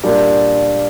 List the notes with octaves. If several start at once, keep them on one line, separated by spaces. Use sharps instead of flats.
A#2 G3 D4 G4